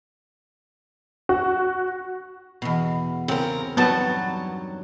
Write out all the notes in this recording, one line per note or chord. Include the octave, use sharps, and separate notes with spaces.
F#4
E2 B2
C#3 C4 A#4
G2 D#3 F#3 B3 A5